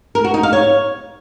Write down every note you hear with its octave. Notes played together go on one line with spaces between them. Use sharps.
A#4
F#4
D#4
F5
C#5